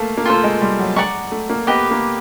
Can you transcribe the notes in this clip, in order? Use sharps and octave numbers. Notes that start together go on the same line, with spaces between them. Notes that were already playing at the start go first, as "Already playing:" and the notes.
Already playing: A3 A#3 F5 A5
A#3
A3 F4 A4 C5
G#3
G3
F#3
G#3 D5 F#5 A#5 C#6
A3
A#3
B3 G4 B4 D#5
A#3